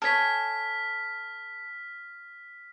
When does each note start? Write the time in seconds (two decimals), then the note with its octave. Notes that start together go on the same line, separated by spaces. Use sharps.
0.02 A4 C#5 G#5 F6 B6